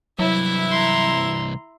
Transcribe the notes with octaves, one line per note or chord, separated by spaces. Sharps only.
C2 E3 F#3 E4 E5
A#5 C6